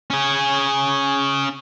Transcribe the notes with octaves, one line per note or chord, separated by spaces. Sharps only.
C#4 G#4